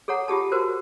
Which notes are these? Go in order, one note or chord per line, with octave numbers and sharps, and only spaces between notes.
G#4 A4 C#5 F#5 A#5
F4 G4 G#4 A5
F#4 A#4 C5